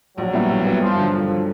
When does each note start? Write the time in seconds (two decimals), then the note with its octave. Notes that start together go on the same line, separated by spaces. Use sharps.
0.18 A#1 F#3
0.33 A#2 G3 B3 E4
0.49 A#1
0.65 A#2 G3 B3 E4
0.81 G2 F3
0.97 D3 F#3
1.13 G2 F3
1.29 D3 F#3